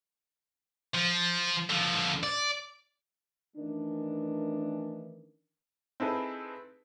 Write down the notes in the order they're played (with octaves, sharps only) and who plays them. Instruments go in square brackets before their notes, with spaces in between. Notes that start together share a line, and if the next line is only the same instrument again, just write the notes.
[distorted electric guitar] F3
D3 F3
D5
[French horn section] D#3 E3 A3 C#4 D4
[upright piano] C4 D#4 E4 G#4 A4 B4